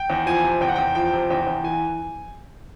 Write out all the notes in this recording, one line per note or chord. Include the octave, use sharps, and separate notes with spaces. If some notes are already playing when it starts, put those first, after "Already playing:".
Already playing: G5
E2
F3 G#5
C3
E2 G5
F#5
E2 G5
F3 G5
C3
E2 G5
E2
E3 G#5